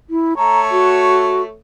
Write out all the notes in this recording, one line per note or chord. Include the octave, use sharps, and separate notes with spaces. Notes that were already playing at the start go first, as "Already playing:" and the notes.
E4
A3 A4 C#5 A#5
F#4